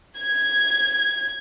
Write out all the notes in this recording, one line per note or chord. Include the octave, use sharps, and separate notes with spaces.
G#6